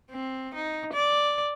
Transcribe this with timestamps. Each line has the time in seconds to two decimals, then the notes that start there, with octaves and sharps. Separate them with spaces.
0.10 C4
0.55 D#4
0.93 D5